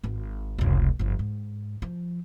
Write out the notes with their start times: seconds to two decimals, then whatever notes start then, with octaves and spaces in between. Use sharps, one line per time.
0.04 G#1 C4
0.59 F1 C#2
0.99 G1 F3
1.19 G#2
1.82 F3